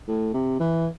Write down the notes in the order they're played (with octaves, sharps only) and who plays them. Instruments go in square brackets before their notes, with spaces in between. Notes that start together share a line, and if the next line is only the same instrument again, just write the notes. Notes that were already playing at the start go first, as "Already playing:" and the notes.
[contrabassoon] A2
C3
E3